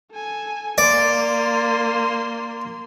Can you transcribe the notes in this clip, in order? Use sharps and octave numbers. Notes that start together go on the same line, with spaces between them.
A4 G#5
A#3 D5 C6